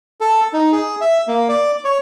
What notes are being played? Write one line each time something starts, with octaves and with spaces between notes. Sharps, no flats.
A4
D#4
G#4
E5
A#3
D5
C#5